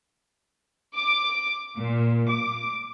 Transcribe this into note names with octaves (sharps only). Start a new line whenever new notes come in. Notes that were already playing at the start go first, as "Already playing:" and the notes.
D6
A#2
D6